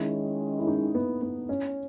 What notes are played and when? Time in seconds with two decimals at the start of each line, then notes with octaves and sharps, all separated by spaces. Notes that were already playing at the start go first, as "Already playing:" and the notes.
Already playing: D#3 G#3 C#4 E4
0.59 E4
0.67 D#4
0.95 B3
1.22 B3
1.49 C#4